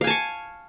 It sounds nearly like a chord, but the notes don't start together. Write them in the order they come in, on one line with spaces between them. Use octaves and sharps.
F5 G#5 A5 C#6